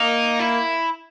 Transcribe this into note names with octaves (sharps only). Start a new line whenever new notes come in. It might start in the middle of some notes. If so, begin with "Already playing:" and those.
Already playing: A#3 D#4
E4